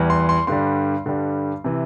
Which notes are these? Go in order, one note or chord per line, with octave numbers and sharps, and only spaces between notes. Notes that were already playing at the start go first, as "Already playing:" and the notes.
Already playing: E2 E3 G3
C6
C6
G2 D3 G3 C6
G2 D3 G3
C3 E3